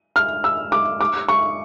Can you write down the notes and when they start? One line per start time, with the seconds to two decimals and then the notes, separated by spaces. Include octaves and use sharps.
0.16 F6
0.44 E6
0.72 D6
1.01 D6
1.28 C#6